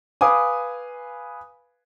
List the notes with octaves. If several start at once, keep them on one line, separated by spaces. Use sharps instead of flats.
B4 F5 G#5 D6 D#6